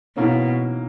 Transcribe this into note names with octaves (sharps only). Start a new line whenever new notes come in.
G#2 B2 E3 A#3 C#4